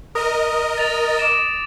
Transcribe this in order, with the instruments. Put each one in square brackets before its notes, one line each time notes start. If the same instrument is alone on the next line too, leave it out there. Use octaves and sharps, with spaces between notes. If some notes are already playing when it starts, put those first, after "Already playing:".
[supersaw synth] A#4 D#5 [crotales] D#6 A#6
[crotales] A6 F7
D6 D7 E7